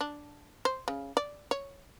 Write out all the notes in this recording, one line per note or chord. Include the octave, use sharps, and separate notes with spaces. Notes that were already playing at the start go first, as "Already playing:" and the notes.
D4
C5
C#3
D5
C#5